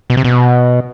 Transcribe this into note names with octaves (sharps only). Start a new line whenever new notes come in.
B2
C3
B2